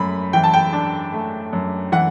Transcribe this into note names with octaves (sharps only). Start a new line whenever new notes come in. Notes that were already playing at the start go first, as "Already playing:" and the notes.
Already playing: F#2 A3 B5
E3 G5
A5
G5
D4
A3
F#2
E3 F#5